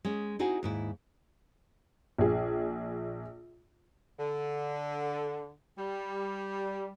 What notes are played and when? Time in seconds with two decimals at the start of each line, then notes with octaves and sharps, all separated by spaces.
0.05 G#3 C#4
0.39 C4 D#4 E4 F#4 G#4
0.63 D#2 G#2 E4
2.18 A#1 G#4
4.19 D3
5.78 G3